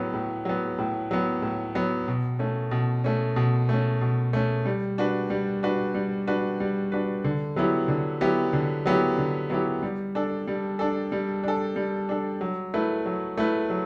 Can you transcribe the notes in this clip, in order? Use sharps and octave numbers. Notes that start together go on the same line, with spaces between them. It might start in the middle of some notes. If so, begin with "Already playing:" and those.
Already playing: A2 F#3 B3
A2
F#3 B3
A2
F#3 B3
A2
F#3 B3
B2
A3 C#4
B2
A3 C#4
B2
A3 C#4
B2
A3 C#4
G3
D4 F#4 B4
G3
D4 F#4 B4
G3
D4 F#4 B4
G3
D4 F#4 B4
D3
F#3 B3 E4 G4
D3
F#3 B3 E4 G4
D3
F#3 B3 E4 G4
D3
F#3 B3 E4 G4
G3
D4 A4
G3
D4 A4
G3
D4 A4
G3
D4 A4
F#3
A3 E4 B4
F#3
A3 E4 B4
F#3